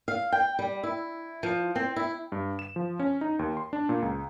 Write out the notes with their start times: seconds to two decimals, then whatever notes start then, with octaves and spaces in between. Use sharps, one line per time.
0.08 F5
0.32 G5
0.59 G3
0.83 E4
1.43 F3
1.75 C4
1.96 E4
2.32 G2
2.59 E7
2.76 F3
3.00 C#4
3.21 D#4
3.39 D#2
3.57 C6
3.73 D4
3.89 A#2
4.02 C#2